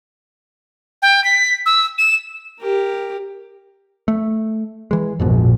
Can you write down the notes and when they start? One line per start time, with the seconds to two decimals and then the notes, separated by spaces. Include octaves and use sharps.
1.02 G5
1.24 B6
1.66 E6
1.98 E7
2.60 G4 A#4
4.08 A3
4.91 E3 G#3
5.19 A#1 F2 G#2 B2